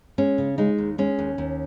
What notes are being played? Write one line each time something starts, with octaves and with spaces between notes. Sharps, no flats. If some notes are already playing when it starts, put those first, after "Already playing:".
G#3 C#4
C#3
G#3 D#4
D#2
G#3 C#4
D#2
D#2